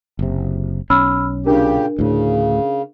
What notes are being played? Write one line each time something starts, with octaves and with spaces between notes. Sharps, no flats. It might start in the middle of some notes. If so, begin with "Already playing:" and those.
F#1 C3
B1 C#4 B5 E6 F6
A#2 C#3 D4 G4 A#4
D2 A2 C#3